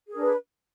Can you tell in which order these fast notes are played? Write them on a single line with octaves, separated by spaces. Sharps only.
G#4 A#4 D4 B4